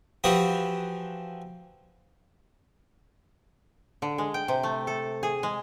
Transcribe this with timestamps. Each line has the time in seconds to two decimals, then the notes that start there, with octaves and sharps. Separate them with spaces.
0.24 E3 F3 F#4 G4 D#6
4.02 D3
4.18 G#3
4.34 G5
4.48 C3
4.63 A3
4.87 A4
5.23 G#4
5.43 G#3